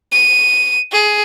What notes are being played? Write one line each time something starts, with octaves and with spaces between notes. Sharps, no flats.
D#7
G#4